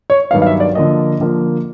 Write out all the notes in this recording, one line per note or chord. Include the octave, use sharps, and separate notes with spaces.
C#5
G2 D#3 F#3 B3 F5
F5
E5
D5
D3 F3 A#3 D#5
D3 F3 A#3